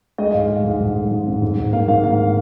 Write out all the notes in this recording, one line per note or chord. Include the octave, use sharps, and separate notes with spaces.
G#3 D#5
G#2 F5
G#3
G#2
G#2
G#3
G#2
C4
G#2
G#2
A#3 F5
G#2 F5
A#3 F5